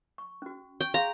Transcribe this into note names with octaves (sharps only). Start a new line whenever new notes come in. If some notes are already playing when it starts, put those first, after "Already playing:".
C#6
C#4 F#4
G5 C#6
G#4 F5 A#5 C6